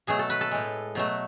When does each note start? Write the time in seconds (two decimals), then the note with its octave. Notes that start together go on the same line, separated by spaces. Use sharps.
0.07 B2 F#3 A3 G#4
0.19 A4
0.30 B4
0.41 A4
0.51 A2 G#3
0.95 B2 F#3 A3